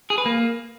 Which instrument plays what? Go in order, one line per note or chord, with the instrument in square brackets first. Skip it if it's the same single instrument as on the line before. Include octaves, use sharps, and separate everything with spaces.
[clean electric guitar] G#4
B4
A#3